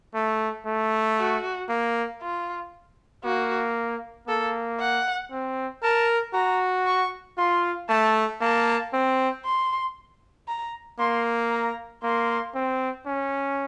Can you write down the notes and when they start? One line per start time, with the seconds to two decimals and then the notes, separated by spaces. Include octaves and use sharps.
0.14 A3
0.66 A3
1.18 F#4
1.69 A#3
2.22 F4
3.24 A#3 F#4
4.28 A#3 A4
4.80 F#5
5.31 C4
5.83 A#4 A5
6.34 F#4 A#5
6.86 C#6
7.38 F4 C6
7.89 A3 A5
8.41 A#3 A5
8.93 C4
9.45 C6
10.48 A#5
10.99 A#3 C6
11.51 A#5
12.03 A#3 C6
12.55 C4
13.06 C#4